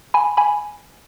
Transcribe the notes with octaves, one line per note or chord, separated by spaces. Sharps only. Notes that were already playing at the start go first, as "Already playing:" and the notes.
G#5 B5
G#5 B5